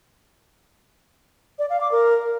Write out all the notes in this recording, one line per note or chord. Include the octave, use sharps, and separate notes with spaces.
D5
F5
D6
A#4